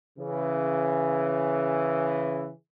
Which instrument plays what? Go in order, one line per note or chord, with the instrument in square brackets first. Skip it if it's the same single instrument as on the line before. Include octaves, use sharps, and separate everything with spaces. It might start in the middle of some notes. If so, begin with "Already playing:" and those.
[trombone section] C#3 E3